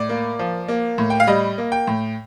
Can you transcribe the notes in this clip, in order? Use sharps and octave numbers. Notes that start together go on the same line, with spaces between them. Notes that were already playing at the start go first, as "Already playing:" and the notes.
Already playing: A2 D5
A#3
F3
A#3
A2
G5
F5
G3 D#5
A#3
G5
A2